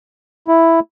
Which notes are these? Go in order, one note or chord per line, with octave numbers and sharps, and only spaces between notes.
E4